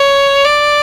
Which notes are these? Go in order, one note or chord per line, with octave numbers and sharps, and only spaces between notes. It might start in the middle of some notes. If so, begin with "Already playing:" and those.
Already playing: C#5
D5